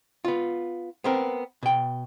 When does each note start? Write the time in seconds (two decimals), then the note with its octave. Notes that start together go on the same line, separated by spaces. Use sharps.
0.25 B3 F4
1.04 B3 C4 A#4
1.63 B2 G5